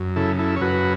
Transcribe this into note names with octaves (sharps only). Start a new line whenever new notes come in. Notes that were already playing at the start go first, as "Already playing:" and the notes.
Already playing: F#2
C#3 E4 A4
E4 A4
C#5
F#2 F#4 B4